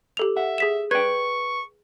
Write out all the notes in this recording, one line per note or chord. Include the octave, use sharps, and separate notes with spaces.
G4 A4 F7
E5 F#5
G#4 B6 E7
B4 D5 G5 C#6 G#6